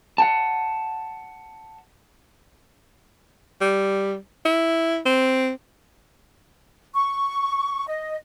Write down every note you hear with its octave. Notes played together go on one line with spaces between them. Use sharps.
F#5 G5 A5
G3
E4
C4
C#6
D#5